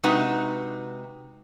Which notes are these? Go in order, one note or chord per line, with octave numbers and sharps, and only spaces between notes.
C3 G#3 D#4 F#4 B4 F#5